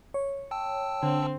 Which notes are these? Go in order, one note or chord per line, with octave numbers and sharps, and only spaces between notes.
C#5
G5 A5 E6
D3 C4